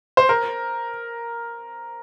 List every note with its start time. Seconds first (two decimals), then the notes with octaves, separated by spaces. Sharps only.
0.17 C5
0.29 A#4